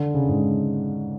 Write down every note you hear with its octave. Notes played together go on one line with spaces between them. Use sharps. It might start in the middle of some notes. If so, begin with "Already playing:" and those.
Already playing: D3
C#3
G#2